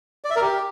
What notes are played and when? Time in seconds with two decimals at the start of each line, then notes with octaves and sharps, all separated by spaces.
0.24 D5
0.30 E5
0.36 A#4
0.42 G4